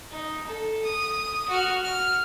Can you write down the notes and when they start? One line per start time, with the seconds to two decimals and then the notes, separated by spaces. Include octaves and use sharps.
0.11 D#4
0.47 A4
0.84 D#6
1.49 F#4 F6
1.84 F6